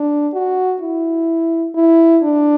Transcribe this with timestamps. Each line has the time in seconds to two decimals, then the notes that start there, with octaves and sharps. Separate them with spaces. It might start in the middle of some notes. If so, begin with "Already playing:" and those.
Already playing: D4
0.33 F#4
0.81 E4
1.75 E4
2.23 D4